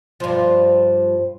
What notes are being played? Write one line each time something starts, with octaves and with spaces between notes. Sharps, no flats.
G2 F3